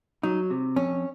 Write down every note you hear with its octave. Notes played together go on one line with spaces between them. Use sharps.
F#3 D#4
C3
F2 C#4